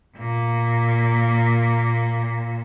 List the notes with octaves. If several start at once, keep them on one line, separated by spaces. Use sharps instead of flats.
A#2 A#3